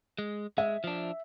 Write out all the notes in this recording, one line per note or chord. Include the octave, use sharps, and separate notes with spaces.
G#3
G#3 E5
F3 D4